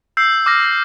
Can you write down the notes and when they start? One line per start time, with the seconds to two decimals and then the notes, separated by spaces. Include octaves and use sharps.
0.17 E6 G6 C7
0.46 D6 F6 A#6